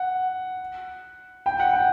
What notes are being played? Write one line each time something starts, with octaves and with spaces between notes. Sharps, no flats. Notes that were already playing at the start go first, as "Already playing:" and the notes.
Already playing: F#5
G5
F#5
G5